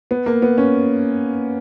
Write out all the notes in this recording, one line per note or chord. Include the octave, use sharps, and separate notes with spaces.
B3
A#3
B3
C#4